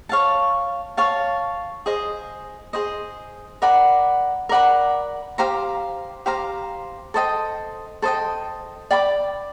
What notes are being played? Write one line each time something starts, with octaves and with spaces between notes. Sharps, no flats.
C#5 F5 A5
C#5 F5 A5
G#4 C5 D#5
G#4 C5 D#5
A#4 D5 F#5 B5
A#4 D5 F#5 B5
G4 C5 F5 A#5
G4 C5 F5 A#5
A4 C5 D#5 G5
A4 C5 D#5 G5
D5 G5 B5 D6